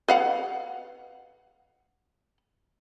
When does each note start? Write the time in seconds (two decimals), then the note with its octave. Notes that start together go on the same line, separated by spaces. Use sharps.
0.08 B4 F5 F#5